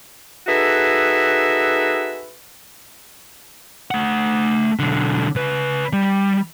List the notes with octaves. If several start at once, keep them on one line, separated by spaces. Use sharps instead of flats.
D#4 F#4 G#4 A4 B4 E5
A3 F#5
B1 D3
C#3 B4
G3